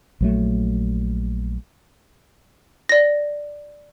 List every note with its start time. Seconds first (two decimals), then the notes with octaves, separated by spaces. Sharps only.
0.21 A#1 F#3 A3
2.89 D5 A#6